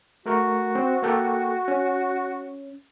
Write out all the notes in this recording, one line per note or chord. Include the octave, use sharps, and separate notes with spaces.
A3 F#4 A#4 C#6
C4 C5
A#3 A4 G5
C#4